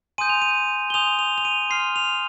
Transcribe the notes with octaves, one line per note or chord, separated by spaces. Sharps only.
G#5 C6 D#6 G6 D#7
F7
D#7
G7
G#5 C6 D#6 G6 F7
F7
F7
D#7
C6 F6 C7
F7